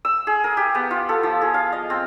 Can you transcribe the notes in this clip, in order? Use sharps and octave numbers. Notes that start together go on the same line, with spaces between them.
E6
G#4
A#4
G4
B3
F4
A4
F3
G#4
F5
D#5
C4